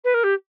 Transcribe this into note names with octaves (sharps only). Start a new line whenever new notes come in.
B4
A#4
G4